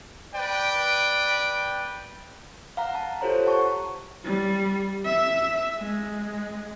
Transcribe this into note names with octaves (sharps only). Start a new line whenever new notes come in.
B4 D5 G5
F5 F#5 A#5
A5 A#5
F4 G4 A4 C5 C#5 A#5
F#5 A5 C#6
G3
E5
G#3